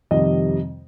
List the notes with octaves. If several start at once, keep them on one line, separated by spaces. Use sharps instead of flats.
F2 C3 D#3 G3 D#5